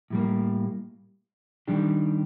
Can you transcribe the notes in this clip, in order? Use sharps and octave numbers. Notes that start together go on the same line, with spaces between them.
A2 G3 A#3
D#3 G3 D4 G4